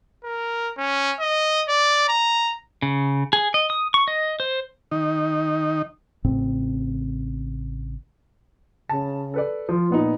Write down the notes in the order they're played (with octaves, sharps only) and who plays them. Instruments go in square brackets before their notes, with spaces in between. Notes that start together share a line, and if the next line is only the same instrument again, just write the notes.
[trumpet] A#4
C#4
D#5
D5
A#5
[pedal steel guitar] C#3
G#4
D#5
D#6
C#6
D#5
C5
[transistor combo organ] D#3 D#4
[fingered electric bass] A1 A2 C#3 C4
[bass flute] C#3 [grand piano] A5
[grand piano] A4 B4 D5
[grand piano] F3 [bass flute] F4
[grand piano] A#2 B3 D#4